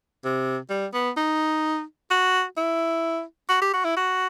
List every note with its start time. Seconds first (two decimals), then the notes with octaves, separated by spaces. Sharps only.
0.25 C3
0.70 G3
0.94 B3
1.17 D#4
2.11 F#4
2.57 E4
3.49 F#4
3.62 G4
3.73 F#4
3.85 E4
3.97 F#4